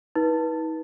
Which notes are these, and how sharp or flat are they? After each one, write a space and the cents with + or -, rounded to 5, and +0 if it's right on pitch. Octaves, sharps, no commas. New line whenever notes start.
D#4 +40 B4 -25